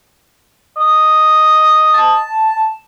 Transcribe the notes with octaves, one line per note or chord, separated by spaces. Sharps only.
D#5
A5